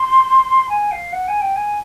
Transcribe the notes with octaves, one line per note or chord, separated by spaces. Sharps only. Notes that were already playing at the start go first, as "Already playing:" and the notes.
Already playing: C6
G#5
F5
F#5
G#5
G5
G#5